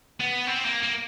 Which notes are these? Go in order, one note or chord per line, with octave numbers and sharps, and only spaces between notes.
B3
C4
A#3
A#3